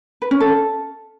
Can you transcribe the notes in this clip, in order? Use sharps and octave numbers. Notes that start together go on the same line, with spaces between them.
B4
C#4
A4